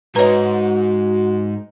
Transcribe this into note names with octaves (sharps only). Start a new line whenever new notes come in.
G#2 F#4 B4 C#5 D#5 A#5